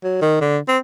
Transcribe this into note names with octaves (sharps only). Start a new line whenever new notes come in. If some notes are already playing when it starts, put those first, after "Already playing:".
F#3
D#3
D3
C4